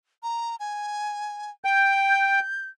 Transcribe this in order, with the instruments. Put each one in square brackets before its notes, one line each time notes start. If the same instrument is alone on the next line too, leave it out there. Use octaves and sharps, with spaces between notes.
[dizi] A#5
G#5
[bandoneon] G5 [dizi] G6